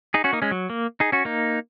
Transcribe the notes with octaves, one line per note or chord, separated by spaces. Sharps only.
D#4 G#4
C#4 F#4
A#3 D#4
G#3 C#4
F#3
A#3
D#4 G#4
C#4 F#4
A#3 D#4